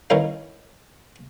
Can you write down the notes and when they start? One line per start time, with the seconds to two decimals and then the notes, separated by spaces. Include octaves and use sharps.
0.10 D#3 E3 C#4 A#4 F5